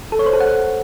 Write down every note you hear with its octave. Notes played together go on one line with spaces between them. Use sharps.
A4
C#5
C5
A4
F#5